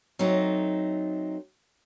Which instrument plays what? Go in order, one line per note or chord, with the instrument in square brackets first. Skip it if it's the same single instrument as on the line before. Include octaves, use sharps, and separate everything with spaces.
[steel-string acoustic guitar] F#3 A3 C4 D#4